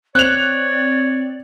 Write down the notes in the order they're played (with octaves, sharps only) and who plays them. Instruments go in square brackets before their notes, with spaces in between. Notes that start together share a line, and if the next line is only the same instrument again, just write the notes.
[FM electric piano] C4 [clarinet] C#5 [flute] D5 [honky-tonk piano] F#6 F7